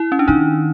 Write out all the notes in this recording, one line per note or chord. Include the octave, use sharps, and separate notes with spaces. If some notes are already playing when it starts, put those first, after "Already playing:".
Already playing: E4
C#4
D4
D#3 D#4